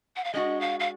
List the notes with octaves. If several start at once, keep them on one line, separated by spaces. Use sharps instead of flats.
F#5
F5
G#3 D4 F#4 D#5
F5
F5